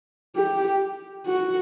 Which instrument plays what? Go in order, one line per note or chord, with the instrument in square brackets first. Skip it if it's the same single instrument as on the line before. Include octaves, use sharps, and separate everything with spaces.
[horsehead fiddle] G4
F#4